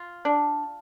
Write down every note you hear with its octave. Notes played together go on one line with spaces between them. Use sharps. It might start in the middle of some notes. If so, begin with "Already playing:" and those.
Already playing: F4
D4